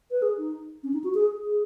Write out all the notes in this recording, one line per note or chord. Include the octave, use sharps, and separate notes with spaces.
B4
G#4
D#4
C#4
D#4
F#4
G#4
G#4